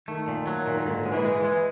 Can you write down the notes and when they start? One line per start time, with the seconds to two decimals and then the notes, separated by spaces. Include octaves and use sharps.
0.08 D#3 A3
0.28 A#2
0.47 F#3
0.67 A#2
0.78 D#3
0.86 G#2 D3
1.05 G#3
1.12 E3
1.25 G#3
1.38 E3
1.45 G#3